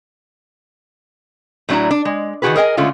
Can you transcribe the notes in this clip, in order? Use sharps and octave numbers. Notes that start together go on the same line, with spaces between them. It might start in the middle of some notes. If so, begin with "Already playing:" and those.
A2 F#3 D4 E4 A#5
D4
G#3
D#3 E3 F#3 F#4 G#4 B4
G#4 A#4 D#5 G5 G#5
D3 G#3 A3 C#4 F4